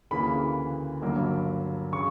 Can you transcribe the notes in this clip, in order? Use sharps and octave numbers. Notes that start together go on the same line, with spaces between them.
D2 C#3 E3 A#3 B5
G1 G2 F#3 A#3
C#3 C#6